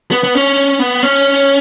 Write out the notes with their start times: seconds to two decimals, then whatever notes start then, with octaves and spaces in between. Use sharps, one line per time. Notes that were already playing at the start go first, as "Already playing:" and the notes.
0.12 B3
0.24 B3
0.35 C#4
0.79 B3
1.03 C#4